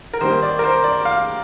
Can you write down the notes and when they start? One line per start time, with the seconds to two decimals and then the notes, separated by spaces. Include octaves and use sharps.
0.13 A#4
0.21 D#3 G3 A#3 C5
0.42 D5
0.59 A#4
0.64 C5
0.84 D5
1.05 F5